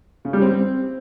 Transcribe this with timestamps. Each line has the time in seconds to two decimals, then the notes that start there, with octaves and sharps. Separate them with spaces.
0.25 C#3
0.33 G3
0.42 C4